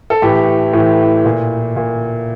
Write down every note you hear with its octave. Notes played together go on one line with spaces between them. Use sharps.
A4
A2 E3 G4
A2 E3
A#2
A#2